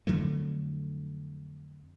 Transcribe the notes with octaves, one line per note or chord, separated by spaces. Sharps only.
F2 D3 F#3 A3